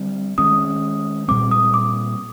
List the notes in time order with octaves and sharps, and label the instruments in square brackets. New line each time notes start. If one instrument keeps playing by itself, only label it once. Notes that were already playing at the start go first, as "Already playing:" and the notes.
Already playing: [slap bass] D3 G3 C4
[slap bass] D#3 G#3 C#4 [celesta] D#6
[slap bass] A#2 G3 C4 [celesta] D6
[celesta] D#6
D6